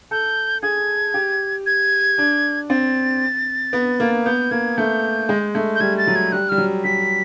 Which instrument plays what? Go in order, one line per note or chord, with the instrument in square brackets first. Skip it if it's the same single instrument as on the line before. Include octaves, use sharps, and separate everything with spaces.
[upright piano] A4 [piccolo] G6
[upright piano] G#4 [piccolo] G#6
[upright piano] G4
[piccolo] G#6
[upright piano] D4
[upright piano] C4 [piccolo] A6
[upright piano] B3
A#3
[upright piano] B3 [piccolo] G6
[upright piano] A#3 [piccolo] G#6
[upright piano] A3 [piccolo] G6
[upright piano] G#3
A3
[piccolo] G6
[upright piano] G3 [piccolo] G#6
[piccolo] A6
[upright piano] F#3
[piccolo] G#6
[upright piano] G3 [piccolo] F#6
[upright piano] G3 [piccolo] F6
[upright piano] F#3
[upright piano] G3 [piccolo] B6